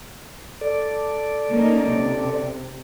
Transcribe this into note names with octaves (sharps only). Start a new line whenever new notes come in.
A4 D5
A#3 C#4 D#4
C3